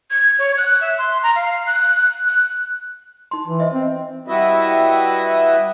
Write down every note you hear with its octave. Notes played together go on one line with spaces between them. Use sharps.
G#6
C#5
F#6
E5
C6
A#5
F5
F#6
F#6
D#4 C6
E3
C5 D#5 E5
C4
G3 E4 F#4 B4 D#5 E5